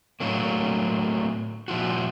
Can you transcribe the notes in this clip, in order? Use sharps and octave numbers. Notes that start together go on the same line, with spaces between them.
A2 D3 F#3 A#3
A#2 F3 E4 F#4